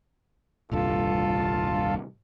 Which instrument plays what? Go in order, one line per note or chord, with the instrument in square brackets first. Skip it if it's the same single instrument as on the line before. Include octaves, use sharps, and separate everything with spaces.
[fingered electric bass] D#1 C2 G2 [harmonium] F4 A4